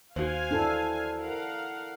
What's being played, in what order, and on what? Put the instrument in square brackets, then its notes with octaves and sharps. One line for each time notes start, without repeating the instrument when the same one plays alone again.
[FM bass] D#2 [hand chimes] F#4 C5 [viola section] F5 G#5
[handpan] D4 E4 A4
[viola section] A#4 F5 F#5